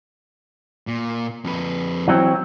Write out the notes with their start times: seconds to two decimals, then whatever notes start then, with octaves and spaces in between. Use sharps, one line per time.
0.87 A#2
1.44 F2 B4
2.08 E3 F#3 C4